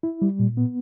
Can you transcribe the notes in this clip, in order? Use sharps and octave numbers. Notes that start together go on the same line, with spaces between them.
E4
G3
A#2
B3